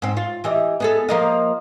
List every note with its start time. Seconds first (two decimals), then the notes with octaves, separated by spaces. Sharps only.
0.02 G#2 C4
0.17 F4
0.44 E3 G4 D#5
0.80 B3 G#4 A4
1.09 F3 A#3 D#5